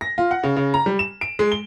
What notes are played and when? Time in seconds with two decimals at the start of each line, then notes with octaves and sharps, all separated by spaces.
0.01 A#6
0.18 F4
0.31 F#5
0.43 C#3
0.56 C#3
0.74 A#5
0.86 G3
0.99 E7
1.21 D7
1.39 G#3
1.52 G7